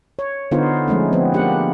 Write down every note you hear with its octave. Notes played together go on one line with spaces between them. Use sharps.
C#5
D3 B3 D#4 F4 C5
F3 G#3 A3 C#4
F3 B3 C4
A#3 D4 G4 F#5